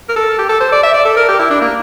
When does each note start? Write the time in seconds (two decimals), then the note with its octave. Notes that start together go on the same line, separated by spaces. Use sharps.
0.09 A#4
0.16 A4
0.39 G4
0.49 A4
0.60 C5
0.72 D5
0.83 E5
0.94 D5
1.05 A4
1.17 A#4
1.29 G4
1.39 E4
1.51 D4
1.61 A#3